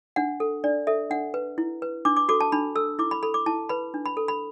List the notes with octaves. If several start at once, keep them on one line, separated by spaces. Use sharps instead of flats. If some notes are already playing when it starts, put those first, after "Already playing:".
D4 F#5
A4
D4 D5
A4 E5
D4 F#5
B4
E4
B4
D4 D6
D6
F#4 A4 D6
A5
D4 B5
A4 E6
E4 D6
B5
A4 B5
D6
E4 A5
B4 B5
D4
B5
A4
B5